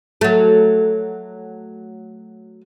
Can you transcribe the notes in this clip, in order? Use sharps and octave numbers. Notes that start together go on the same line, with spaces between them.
F#3 A3